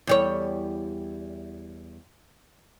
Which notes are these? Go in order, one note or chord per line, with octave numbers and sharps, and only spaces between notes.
E2 G3 C#5